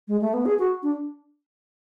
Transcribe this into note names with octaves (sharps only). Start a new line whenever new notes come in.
G#3
A3
B3
G#4
F#4
D4